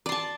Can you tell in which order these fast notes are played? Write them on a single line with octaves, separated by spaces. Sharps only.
D5 C6 A5